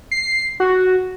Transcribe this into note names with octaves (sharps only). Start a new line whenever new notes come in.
C7
F#4